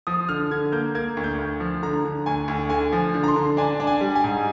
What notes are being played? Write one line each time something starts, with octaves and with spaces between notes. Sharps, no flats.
F3 D#6
D3 F6
D3 G#6
A#3 G6
A#3 G#6
D2
G6
D2
F3
D3 A#5
D3
D2 G#5
D2
D3 G#5
F3
D3
A#5
C6
D3
D4 G#5
D4
G#5
G3
G#5
G#2